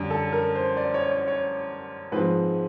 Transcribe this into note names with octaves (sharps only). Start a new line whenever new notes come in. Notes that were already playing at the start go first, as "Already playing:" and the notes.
Already playing: F#2 D3 G3
A4
A#4
C5
D5
C#5
C#5
C#5
G#2 F3 G#3 C4 B4